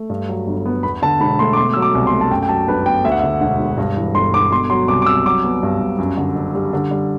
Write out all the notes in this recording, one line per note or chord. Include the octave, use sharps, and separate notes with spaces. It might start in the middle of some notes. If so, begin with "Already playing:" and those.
Already playing: A3
G2
F#3
G1
B3
E2 B5
D3 A5
E1 B5
A3 C6
D6
B2 C6
F#3 E6
D6
C2
C6
A3
A5
F#2 G5
G5
F#3 A5
G1 B4
B3 G5
D2 E5
F#5
E5
D3
E1 F#5
E1
G2
E3
G1 C6
G1 D6
B2 C6
F#3 C6
C2 D6
D6
C2 E6
F#3 D6
B3
G2
G2
F#2
D3
F#1
G3
D3
G3